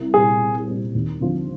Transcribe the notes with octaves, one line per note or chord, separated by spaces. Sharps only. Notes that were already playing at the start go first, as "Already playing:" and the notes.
Already playing: C2
A#2 G3 C4 G#4
C2
A#2 G3 C4
D#2
D3 F3 C4 F4